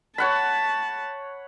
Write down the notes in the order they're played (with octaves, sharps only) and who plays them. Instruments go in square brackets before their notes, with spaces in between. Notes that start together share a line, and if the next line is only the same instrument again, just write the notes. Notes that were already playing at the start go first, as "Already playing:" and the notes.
[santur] C#5 F#5 B5 [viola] A5